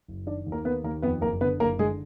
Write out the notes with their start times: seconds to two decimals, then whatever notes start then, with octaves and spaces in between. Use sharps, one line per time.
0.08 F#1
0.26 D#3 D4 D5
0.46 D#2
0.52 A#3 A#4
0.65 A#3 B3 B4
0.84 D#2 A#3 A#4
1.02 F2 B3 B4
1.21 F#1 A#3 A#4
1.41 D3 B3 B4
1.60 F#1 A#3 A#4
1.78 D3 G#3 G#4